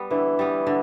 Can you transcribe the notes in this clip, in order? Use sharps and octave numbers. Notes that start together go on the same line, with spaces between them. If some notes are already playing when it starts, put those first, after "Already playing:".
Already playing: G3 B3
D3 E3
G3 B3
D3